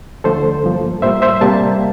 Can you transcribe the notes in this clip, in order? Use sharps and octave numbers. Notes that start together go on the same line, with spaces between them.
D2 D3 F3 A3 A4 C5
G2 F3 A#3
A2 G3 A#3 C5 E5
C5 E5
C3 G3 A#3 A5